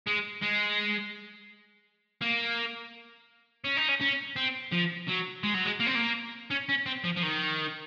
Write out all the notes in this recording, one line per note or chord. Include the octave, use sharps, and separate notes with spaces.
G#3
G#3
A#3
C#4
D#4
C#4
C#4
C4
F3
F#3
G#3
F#3
G#3
A#3
C4
A#3
C#4
C#4
C4
F3
F3
D#3